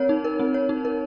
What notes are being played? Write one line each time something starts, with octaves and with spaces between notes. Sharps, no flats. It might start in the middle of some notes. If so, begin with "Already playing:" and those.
Already playing: C4 A#4 C#5
D#4
A#4
C4
C#5
D#4
A#4